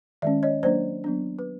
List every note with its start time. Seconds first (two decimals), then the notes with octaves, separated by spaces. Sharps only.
0.22 D#3 G#3 C#4 D5 E5
0.43 C#5 D#5
0.63 F#3 A#3 D4 C5 D5
1.04 F#3 B3 D4
1.39 B4